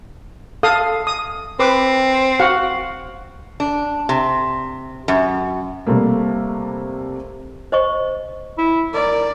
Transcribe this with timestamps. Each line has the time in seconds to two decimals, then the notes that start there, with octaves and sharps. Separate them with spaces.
0.63 A4 F5 D#6
1.07 D#6
1.59 C4 B4 D6
2.39 F#4 F5 F#5
3.60 D4
4.09 C3
5.08 F#2
5.87 C3 G3 A3 A#3
7.72 C5 D#5 C#6
8.58 E4
8.93 A#4 D5